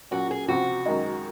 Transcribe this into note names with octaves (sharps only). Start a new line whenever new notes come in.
A#2 F#3 C#4 F#4
G#4
C#2 C3 F3 C4 F#4
F#2 D#3 G#3 D#4